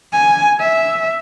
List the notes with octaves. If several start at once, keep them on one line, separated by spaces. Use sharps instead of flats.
G#5
E5